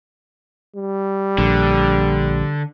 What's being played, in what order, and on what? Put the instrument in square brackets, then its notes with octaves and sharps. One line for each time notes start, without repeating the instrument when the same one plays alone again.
[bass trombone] G3
[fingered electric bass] A#1 [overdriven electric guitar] D3